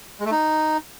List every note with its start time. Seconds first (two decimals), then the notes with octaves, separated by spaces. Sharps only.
0.20 G#3
0.26 A3
0.31 D#4